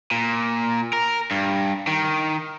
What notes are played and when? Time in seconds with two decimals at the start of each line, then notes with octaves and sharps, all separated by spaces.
0.11 A#2
0.93 A#4
1.31 G2
1.87 D#3